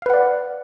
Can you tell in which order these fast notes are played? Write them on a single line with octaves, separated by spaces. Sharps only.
F5 B4 F#5 D5